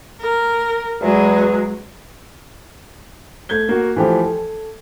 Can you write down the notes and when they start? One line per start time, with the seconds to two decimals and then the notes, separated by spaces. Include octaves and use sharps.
0.20 A#4
1.01 E2 F#3 G#3
3.49 A3 G6 G#6 G7
3.69 A#3 F#4
3.96 E3 F3 A3 G4
4.24 A4